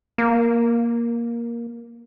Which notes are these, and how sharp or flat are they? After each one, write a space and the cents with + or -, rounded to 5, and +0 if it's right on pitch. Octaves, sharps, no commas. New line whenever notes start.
A#3 +10